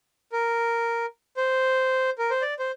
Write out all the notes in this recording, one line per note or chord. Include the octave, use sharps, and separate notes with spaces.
A#4
C5
A#4
C5
D5
C5